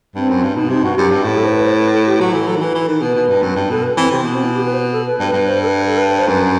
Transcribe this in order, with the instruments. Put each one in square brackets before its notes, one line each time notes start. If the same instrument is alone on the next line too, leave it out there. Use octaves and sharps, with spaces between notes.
[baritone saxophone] G2 [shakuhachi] C4
[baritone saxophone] F#2
G2
[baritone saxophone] B2 [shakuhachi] D#4
[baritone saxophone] C3 [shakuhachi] D#4
[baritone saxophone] G2 [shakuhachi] F#4
[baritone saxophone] F#2 [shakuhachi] G4
[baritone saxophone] G2
A2
[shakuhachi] G4
A4
C5
B4
C5
B4
A4
G4
[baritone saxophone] F#3 [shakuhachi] F#4
[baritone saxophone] E3 [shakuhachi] A4
[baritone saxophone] F#3 [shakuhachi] A4
[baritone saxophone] D#3
[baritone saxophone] E3 [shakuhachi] B4
[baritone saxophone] E3
D#3
[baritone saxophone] B2 [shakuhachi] B4
[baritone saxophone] B2
G2
F#2
G2
[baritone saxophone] B2 [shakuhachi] A4
[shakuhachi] B4
[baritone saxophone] E3 [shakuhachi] C4
[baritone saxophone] C3 [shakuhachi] C4
[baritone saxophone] B2 [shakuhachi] B3
[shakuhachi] C4
E4
G4
B4
C5
B4
A4
B4
[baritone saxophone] G2
[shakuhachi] B4
[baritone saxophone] G2
[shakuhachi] C5
A4
B4
A4
B4
B4
C5
[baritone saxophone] F#2 [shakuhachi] B4